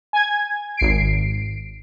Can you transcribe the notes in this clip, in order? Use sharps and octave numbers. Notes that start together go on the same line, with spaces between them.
G#5 G#6
G#1 C7 D7